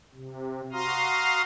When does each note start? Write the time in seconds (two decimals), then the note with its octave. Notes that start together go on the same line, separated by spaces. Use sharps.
0.14 C3
0.72 F#4 F5 A#5 C6 D#6 F6